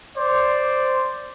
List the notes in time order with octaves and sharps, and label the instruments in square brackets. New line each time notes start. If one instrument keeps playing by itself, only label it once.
[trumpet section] C5 D5